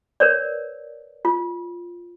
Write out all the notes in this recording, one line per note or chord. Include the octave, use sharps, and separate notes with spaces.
A#4 B4 C#5 D5
F4